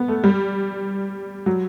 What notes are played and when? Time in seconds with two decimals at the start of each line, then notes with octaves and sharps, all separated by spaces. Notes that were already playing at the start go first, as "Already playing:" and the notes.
Already playing: B3
0.08 A3
0.24 G3
1.46 F#3